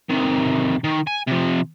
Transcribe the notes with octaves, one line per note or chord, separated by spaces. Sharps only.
C3 D#3
D#3
G#5
C3 F3